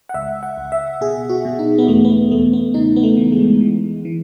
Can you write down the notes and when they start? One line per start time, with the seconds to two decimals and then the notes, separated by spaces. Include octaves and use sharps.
0.09 F#5
0.14 C#2 E5
0.43 F#5
0.57 C#2
0.72 E5
1.01 B2 G#4
1.29 F#4
1.45 B2
1.59 D#4
1.78 B3
1.87 E2 A3
2.05 B3
2.10 A3
2.31 E2 A3
2.53 B3
2.74 C#3 D#4
2.96 B3
3.03 A3
3.17 E3
3.32 G#3
3.61 E3
4.05 E3